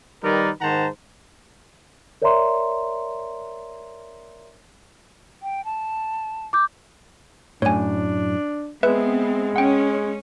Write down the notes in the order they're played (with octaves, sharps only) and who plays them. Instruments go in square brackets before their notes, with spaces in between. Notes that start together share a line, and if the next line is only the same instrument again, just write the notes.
[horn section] D#3 G3 D#4 A#4 B4 D5
G#2 D#3 C5 F#5 A5 A#5
[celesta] A#4 C#5 D5 E5 A#5 C6
[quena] G5
A5
[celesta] D6 G6
[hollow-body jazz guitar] F#2 A2 [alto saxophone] D4 [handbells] C#5 G#5
[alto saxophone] G#3 [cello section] B3 C4 [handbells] B4 [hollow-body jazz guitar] E5
[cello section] C#4 [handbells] F#5 G5